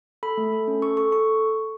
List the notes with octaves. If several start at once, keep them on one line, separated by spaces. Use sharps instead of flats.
A4 B5
A3
A4
C#4
A4 C#6
A4 C#6
A4 C#6